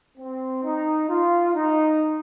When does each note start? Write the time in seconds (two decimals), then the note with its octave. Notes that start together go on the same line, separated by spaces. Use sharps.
0.18 C4
0.64 D#4
1.09 F4
1.55 D#4